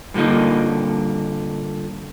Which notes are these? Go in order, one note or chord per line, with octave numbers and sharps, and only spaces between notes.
G2 A#2 D3 A#3 D#4